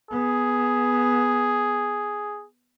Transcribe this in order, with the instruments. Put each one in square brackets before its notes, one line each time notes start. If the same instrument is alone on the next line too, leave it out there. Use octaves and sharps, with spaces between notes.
[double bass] B3 [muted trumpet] G#4